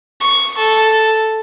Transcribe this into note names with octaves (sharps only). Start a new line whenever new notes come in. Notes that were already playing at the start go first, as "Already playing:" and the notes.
C#6
A4